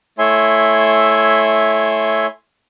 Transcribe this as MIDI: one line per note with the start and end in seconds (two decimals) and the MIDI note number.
0.18 2.26 57
0.18 2.26 64
0.18 2.26 73
0.18 2.26 76
0.18 2.26 80
0.18 2.26 84